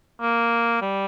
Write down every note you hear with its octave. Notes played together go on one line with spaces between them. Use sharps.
A#3
G3